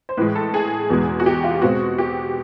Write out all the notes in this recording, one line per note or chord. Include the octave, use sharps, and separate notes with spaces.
C5
A2 E3 G#3 B4
A4
G#4
E2 B2 G#3
F#4
G4
F4
B2 G#3 C4 F#4
G4